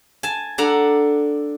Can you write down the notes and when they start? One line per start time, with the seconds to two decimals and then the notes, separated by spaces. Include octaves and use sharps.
0.23 G#5 A5
0.58 D4 A4 F#5 A#5